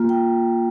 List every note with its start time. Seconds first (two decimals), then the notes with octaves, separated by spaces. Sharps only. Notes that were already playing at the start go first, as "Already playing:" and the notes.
Already playing: A#3 F4
0.09 G5